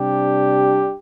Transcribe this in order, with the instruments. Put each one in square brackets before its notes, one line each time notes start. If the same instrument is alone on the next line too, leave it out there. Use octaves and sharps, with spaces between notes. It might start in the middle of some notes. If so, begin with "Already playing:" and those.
Already playing: [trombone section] C3 G3 D4 G4